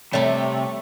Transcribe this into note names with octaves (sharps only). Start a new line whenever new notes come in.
C3 G3 A3 A4 C#5 E5